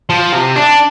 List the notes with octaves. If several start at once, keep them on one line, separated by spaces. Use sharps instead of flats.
F3
C3
D4